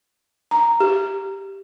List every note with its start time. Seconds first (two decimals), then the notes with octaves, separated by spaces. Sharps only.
0.51 A#5
0.80 G4